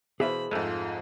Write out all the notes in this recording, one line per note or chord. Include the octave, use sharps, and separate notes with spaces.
B2 E3 G#4 C5 E5 F5 B5
F2 G#2 G#3 A3 F4